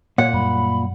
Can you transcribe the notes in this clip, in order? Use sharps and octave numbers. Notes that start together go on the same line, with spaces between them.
A#2 C#5 F#5
F#2 G3 B5